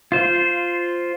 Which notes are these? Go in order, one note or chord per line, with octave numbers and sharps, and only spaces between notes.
F4 C5